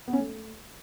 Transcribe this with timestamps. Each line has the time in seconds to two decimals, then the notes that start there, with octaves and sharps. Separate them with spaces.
0.08 B3
0.13 C#4
0.19 A3